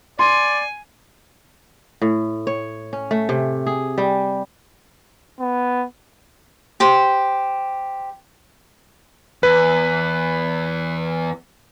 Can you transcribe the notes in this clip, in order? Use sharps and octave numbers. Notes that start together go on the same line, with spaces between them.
D5 G#5 C6
A2
C#5
C#4
A3
C3
G#4
G3
B3
G4 C5
E2 B4